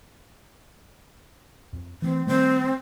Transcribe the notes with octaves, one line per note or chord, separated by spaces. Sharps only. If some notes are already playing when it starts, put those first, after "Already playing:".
F2
E3 A3 C4
D#3 G3 A3 C4